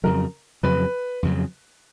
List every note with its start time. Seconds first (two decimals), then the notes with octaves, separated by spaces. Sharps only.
0.04 F2 C#3 F#3 A#4
0.63 F2 C#3 F#3 B4
1.23 F2 C#3 F#3